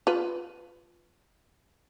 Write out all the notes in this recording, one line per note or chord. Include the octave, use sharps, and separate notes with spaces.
F4 B4